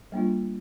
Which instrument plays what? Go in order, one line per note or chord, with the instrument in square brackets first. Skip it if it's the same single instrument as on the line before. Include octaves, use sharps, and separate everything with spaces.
[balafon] G3 A#3 D4 F4